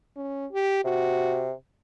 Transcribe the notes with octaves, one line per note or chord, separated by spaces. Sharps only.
C#4
G4
C3 F#4